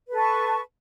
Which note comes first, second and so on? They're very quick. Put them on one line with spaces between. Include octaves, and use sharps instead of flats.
B4 A4 A5 C#6